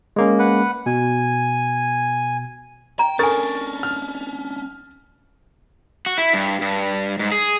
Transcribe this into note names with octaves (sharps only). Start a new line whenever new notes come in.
G#3 A#3 C#4
B4 F#5
B2 G#5
G5 A#5
C#4 D4 A4 A#4 G#5 C#6 A6
F6
F#4
E4
G2
G2
G#2
G#4